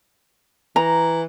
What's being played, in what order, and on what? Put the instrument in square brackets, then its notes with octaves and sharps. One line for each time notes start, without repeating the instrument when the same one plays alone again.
[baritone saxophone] E3 [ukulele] A#5